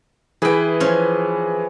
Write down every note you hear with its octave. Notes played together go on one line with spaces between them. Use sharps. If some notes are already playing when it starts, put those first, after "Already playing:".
E3 E4 G#4 B4 G5
F3 C#4